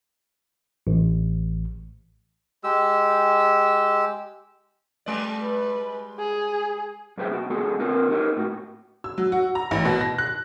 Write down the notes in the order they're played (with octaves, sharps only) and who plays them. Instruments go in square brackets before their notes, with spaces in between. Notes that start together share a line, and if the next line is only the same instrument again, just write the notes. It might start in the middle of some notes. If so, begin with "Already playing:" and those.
[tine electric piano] A1
[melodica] G#3 G4 E6
[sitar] G3 G#3 D5
[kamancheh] B4
G#4
[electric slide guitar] F#2 G#4 B4 C5 E5 G5
B3 F#4
G#3 B3 F#4 G#4 A4
C4 F4 A#4 B4
D#4 G4 A#4 B4
A2 F#4
[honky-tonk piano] E6
F#3
F#4
A#5
A1
B2
A#6
F#6